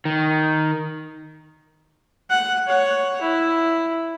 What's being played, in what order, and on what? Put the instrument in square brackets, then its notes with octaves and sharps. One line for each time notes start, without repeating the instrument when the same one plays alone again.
[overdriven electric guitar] D#3
[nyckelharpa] F#5
C#5 F#5
E4